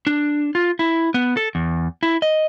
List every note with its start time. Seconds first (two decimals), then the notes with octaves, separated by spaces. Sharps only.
0.07 D4
0.55 F4
0.79 E4
1.14 B3
1.37 A4
1.55 E2
2.03 E4
2.22 D#5